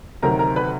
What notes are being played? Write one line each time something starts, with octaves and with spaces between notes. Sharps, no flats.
D2 C3 D#3 F#3 A#4 A#5
A#4 A#5
B4 B5